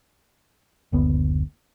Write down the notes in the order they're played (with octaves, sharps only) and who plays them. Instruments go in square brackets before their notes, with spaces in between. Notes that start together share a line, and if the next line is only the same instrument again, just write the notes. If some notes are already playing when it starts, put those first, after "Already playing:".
[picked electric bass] F#1 D2 B3